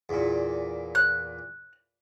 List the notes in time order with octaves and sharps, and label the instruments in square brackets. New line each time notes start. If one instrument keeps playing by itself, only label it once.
[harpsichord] E2 A#2
[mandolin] F#6